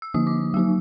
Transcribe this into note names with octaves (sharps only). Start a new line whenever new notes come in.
E6
D3 F3 A#3 D#4 D#6
D6
F#3 A#3 D#4 E6